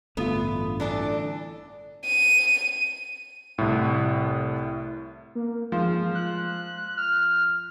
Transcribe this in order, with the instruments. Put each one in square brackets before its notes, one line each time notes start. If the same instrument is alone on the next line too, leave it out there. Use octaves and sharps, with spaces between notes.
[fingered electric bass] A1 G2 D3 [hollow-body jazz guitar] A3 F4 [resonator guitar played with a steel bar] B3
[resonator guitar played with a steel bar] E3 D4 A4
[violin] D#7
[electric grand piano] C2 A2
[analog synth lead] A#3
[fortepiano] F3 [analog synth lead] G#3
[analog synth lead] F#6
F6